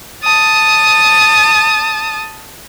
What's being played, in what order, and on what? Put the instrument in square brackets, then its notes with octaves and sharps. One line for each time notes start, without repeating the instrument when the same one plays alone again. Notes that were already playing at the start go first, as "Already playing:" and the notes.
[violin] A5 D#6